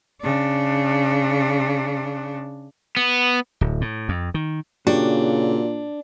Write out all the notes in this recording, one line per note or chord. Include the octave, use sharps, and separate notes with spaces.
C#3 D4
B3
D1
A2
F2
D#3
A#2 C#3 D4 F#4 G4